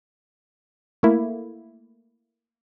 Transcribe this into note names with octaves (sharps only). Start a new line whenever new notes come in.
A3 A#3 E4